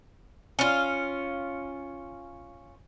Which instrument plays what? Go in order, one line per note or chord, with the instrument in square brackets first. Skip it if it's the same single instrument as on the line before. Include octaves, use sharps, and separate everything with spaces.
[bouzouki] C#4 F4